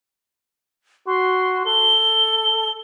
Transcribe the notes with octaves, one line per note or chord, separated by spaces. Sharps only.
F#4 C6
A4 G7